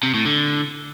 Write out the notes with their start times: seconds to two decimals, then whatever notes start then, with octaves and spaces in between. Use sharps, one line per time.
0.03 C3
0.14 A2
0.25 D3